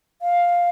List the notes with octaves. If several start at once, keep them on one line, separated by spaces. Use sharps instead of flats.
F5